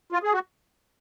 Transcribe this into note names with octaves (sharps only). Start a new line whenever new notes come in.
F4
G#4
F#4